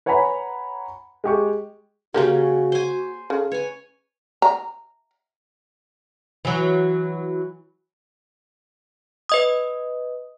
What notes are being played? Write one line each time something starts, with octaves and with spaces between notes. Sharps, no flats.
B4 C#5 F#5 G#5 A#5 B5
G#3 G4 C#6
C#3 A#3 C#4 F#4 G4 A#4
C5 G#5
C#3 A4
B4 C#5 G#5
A#5
E3 F#3
B4 D#5 D#6